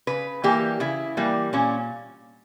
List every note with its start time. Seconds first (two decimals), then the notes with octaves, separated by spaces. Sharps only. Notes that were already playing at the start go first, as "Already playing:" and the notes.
0.07 C#3 B4
0.44 E3 G3 A#3 G4
0.80 C#3 E4
1.17 E3 G3 A#3
1.53 A#2 C#4